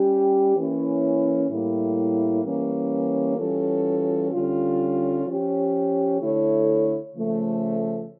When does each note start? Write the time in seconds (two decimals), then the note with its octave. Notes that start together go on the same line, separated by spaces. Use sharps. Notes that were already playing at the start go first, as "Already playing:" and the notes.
Already playing: G3 C#4 G4
0.56 E3 A#3 C#4 E4
1.50 A2 G3 A#3 E4
2.44 E3 G3 A#3 C#4
3.37 E3 G3 C#4 F4 A4
4.31 D3 G3 C#4 F4
5.25 F3 C#4 G4
6.20 D3 A3 E4 A4 C#5
7.14 C#3 F3 A3